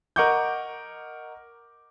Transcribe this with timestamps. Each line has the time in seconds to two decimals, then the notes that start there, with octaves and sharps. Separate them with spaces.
0.16 A#4 D#5 F#5 C#6 D6 G6